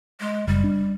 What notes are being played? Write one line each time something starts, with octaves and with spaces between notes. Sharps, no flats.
G#3
F#1 G3
D4